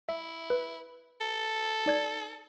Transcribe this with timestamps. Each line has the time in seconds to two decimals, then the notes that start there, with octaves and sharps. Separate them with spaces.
0.09 E4 E5
0.50 B4
1.21 A4
1.86 D#4 D5 G#6